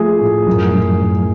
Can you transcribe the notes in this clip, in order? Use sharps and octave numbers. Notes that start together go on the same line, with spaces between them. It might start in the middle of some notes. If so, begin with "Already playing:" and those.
Already playing: F3 A3 G#4
A2
F#2
F#2
F#2